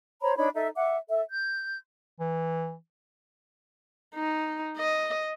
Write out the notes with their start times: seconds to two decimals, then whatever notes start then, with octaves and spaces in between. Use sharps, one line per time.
0.22 C5 C#5 A#5 B5
0.36 D4 D#4 C#5 B5
0.54 D#4 A4 E5
0.77 E5 F#5 D6
1.09 A4 E5
1.29 G6
2.20 E3
4.15 D#4
4.77 D#5